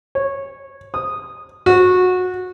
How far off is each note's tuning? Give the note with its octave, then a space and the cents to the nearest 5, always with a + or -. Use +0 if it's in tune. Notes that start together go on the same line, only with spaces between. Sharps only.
C#5 -10
D#6 -10
F#4 -20